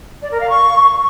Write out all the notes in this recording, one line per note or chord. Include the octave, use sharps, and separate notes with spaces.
D5
A#4
F5
C#6